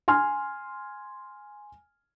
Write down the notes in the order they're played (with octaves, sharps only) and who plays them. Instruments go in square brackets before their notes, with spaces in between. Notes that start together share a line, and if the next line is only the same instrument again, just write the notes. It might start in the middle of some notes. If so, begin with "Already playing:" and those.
[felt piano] G#5 C6 F6